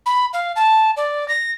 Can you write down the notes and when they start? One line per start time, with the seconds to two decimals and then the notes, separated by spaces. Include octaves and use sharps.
0.06 B5
0.33 F5
0.56 A5
0.97 D5
1.28 A#6